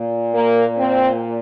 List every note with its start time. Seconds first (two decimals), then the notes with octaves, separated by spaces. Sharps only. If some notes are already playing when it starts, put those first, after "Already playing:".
Already playing: A#2
0.35 A#3
0.78 C4